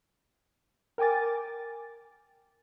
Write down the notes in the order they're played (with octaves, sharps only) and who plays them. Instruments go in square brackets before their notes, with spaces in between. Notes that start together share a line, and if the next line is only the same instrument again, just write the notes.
[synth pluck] A#4 G5 G#5 D6 A6